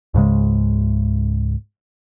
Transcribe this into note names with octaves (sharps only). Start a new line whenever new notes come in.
C#2 G#2 C#3 G#3